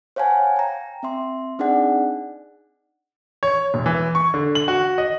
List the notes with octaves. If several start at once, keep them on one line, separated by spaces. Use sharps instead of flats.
C5 C#5 F5 F#5 G#5 A5
G5 A#5
C4 E5 C6
C4 D4 D#4 G#4 D5 F#5
C#5
E1
E3
C#6
D3
F#7
F#4
D#5